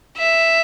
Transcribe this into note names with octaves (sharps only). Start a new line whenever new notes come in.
E5